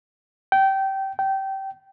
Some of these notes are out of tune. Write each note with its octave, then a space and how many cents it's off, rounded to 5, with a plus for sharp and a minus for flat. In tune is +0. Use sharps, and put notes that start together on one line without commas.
G5 -20
G5 -20